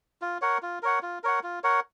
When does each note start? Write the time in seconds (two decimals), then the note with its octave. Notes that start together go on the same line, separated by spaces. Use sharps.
0.22 F4
0.41 A#4 C#5 F#5
0.62 F4
0.83 A#4 C#5 F#5
1.02 F4
1.23 A#4 C#5 F#5
1.43 F4
1.64 A#4 C#5 F#5